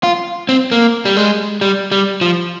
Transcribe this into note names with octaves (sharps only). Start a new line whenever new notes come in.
F4
C4
A#3
G3
G#3
G3
G3
F3